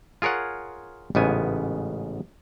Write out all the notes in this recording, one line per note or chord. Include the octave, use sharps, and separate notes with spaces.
F4 G#4 A#4 C#5 F#5
A1 G#2 C#3 B3 G#5